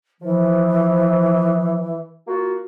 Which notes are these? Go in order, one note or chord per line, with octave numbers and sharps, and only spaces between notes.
E3 F3
A#3 F4 F#4